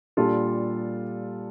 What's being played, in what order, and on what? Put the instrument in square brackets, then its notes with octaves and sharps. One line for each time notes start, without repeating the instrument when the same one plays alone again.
[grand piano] A#2 G3 D4 F4 A4